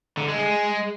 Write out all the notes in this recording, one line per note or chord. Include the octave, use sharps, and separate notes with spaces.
D3
G#3
G#3